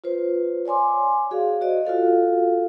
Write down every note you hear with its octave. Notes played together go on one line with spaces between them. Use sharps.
F4 B4 C5
C#5 D5 G#5 C6 D6
F#4 G#4 D5 F5
F#4 C5 D5 D#5
F4 F#4 A4 F5